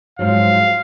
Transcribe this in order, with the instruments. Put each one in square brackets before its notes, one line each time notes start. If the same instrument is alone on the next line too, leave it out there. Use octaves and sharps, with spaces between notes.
[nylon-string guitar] G#2 F3 F#3 [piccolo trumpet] F5